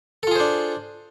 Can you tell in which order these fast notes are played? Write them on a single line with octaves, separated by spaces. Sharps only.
A4 F4 G#4 C5 D4